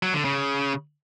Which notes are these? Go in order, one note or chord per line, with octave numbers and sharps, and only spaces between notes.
F#3
D3
C#3